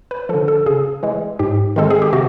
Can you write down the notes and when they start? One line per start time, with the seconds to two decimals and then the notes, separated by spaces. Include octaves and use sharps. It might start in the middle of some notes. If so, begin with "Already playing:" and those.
0.11 B4
0.29 D3 F3 A4
0.48 A4
0.66 C#3 G#4
1.03 E3 G#3
1.39 G#2 G4
1.76 D#3 G#3 C4 A4
1.90 G#4
2.02 G4
2.13 C3 F#4